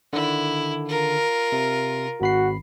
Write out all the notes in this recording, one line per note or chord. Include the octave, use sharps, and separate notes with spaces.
D3 D#3 E4
F4 A#4
C3
G#1 F#4 B5 C7